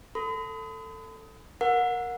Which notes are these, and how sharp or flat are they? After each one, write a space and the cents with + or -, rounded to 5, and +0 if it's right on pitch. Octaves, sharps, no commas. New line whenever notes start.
A4 +15 B5 +45
A#4 +10 F#5 -25